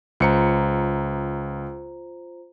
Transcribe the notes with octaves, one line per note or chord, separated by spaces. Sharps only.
C#2 F4 C5 A#5 C#7